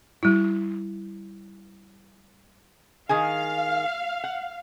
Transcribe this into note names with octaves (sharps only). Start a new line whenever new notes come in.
G3 E4
D#3 G#4 F5 G#5
F#5